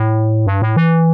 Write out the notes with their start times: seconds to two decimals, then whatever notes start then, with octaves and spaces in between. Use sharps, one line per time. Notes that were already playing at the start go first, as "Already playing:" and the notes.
Already playing: A2
0.47 G2
0.62 A2
0.76 E3